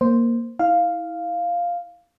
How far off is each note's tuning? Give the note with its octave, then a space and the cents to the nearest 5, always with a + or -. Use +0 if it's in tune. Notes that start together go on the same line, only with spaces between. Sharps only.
A#3 +0 C5 +0
E4 -25 F5 +0